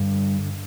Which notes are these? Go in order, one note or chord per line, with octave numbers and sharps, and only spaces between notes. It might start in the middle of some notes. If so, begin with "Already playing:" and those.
Already playing: G2 D3